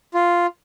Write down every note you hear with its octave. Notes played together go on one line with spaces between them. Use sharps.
F4